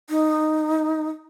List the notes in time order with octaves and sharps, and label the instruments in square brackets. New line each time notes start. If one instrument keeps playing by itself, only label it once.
[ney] D#4